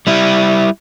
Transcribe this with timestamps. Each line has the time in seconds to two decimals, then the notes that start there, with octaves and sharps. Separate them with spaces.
0.07 G3 E4